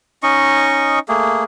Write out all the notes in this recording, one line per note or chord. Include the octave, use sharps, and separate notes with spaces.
C#4 D#4 D#5 C#6
A3 A#3 G#4